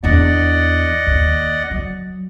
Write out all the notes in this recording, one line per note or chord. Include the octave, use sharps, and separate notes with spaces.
E2 D4 D5 D#5 F#5
D#2
F#3